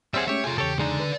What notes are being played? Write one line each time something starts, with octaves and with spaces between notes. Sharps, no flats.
G3 C4 G#4 C5 C#5 E5 F#5 D6
G#3 A3 C#4 G4 C#5 E5
F4 G#4 A4 G#5 A#5
E2 C#3 G4 A4 C#5
D3 G#3 D4 D#4
B4